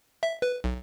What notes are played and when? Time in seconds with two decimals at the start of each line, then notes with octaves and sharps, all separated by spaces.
0.23 E5
0.42 B4
0.64 B1